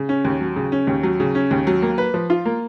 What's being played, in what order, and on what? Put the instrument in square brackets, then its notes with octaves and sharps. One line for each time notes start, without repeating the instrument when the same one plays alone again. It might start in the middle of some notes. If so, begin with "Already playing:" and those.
Already playing: [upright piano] C#3
C#4
D#2
F#3
C#3
C#4
D#2
F#3
C#3
C#4
D#2
F#3
A#3
B4
F3
F4
A#3